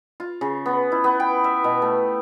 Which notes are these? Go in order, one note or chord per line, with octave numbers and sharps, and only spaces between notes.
F4
C#3
B3
E4
B3
G5
E5
B2
A3